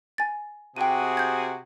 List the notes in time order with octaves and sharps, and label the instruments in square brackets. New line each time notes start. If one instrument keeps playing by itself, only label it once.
[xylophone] G#5 A6
[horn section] C3 F#4 G#4 [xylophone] G5 D#7
[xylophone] G6 G#6